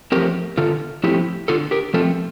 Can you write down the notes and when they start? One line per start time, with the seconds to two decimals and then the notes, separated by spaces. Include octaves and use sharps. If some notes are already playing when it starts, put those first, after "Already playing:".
0.12 F3 A3 C4 G4 A#4
0.57 D3 F4 A4
1.04 F3 A3 C4 E4 G4
1.48 D3 F4 A4
1.71 G4 A#4
1.94 F3 A3 C4 F4 A4